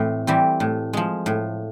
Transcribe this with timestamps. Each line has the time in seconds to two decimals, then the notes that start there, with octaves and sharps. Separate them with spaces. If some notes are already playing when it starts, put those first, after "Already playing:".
Already playing: A2 E3 C4
0.27 E3 G3 C4
0.60 A2
0.93 F3 G#3
1.26 A2